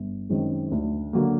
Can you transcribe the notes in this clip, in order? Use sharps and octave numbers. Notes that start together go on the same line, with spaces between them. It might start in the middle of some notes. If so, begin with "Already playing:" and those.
Already playing: G1
F#2 D#3 G#3 C4
D2
D3 F#3 A#3